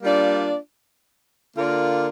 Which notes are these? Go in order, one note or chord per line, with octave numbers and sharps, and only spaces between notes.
G3 A#3 D4 F4 D5
D3 A#3 F4 A#4 D5